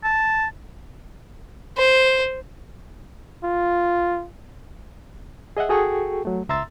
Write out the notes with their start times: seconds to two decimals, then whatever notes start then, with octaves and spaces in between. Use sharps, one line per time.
0.04 A5
1.78 C5
3.43 F4
5.57 G#4 D#5 E5 F#5
5.69 F#4 G#4 A4 G5 C#6
6.25 F#3 A3
6.49 C#2 E5 A#5 C6 E6 A6